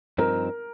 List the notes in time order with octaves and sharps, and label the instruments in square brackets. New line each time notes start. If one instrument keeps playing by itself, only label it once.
[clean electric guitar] G2 F3 C4 D#4 [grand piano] A#4